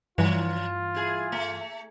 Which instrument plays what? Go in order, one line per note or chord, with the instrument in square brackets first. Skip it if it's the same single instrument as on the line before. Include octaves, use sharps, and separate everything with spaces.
[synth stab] G2 E3 [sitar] F3 [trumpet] F4
[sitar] E4 G#4
A3